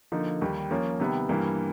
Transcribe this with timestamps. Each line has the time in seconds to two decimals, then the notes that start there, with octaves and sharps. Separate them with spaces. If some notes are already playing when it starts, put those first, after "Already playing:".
0.12 D3 F3 A#3 D#4
0.41 D#2 D#3 G3
0.71 F3 A#3 C#4
1.00 C3 D#3 G3 B3
1.29 G2 E3 G3 A#3